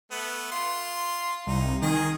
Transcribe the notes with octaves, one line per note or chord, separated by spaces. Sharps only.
A3 B3
F4 C6
C2 D#4
D#3 G#4 D#5